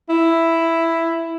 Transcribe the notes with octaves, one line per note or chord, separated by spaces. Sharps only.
E4